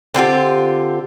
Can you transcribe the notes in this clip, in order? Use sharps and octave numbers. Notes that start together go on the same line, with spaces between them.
D3 C4 F4 G4